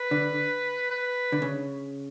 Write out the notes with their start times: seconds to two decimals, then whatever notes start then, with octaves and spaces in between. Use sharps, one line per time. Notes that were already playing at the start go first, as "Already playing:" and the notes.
Already playing: B4
0.11 D3
0.90 B4
1.32 D3
1.42 C#3